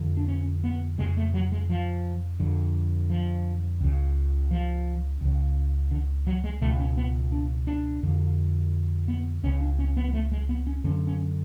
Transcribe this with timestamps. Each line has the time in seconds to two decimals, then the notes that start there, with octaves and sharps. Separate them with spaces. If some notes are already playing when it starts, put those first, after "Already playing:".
Already playing: F2 D3
0.17 D4
0.28 C#4
0.64 B3
0.98 F2 C#3 G#3
1.17 A3
1.34 F#3
1.52 G#3
1.70 F3
2.40 F2 D3
3.10 F3
3.81 C#2 C#3
4.51 F3
5.21 C#2 C#3
5.91 D3
6.27 F#3
6.44 G#3
6.61 C#2 B2 A3
6.79 C#4
6.97 B3
7.32 D4
7.67 D4
8.03 F2 D3
9.08 B3
9.43 C#2 C#3 C#4
9.60 D4
9.79 C#4
9.97 B3
10.09 B3
10.13 A3
10.32 G#3
10.49 B3
10.67 C#4
10.84 F#2 D3 C#4
11.07 C#4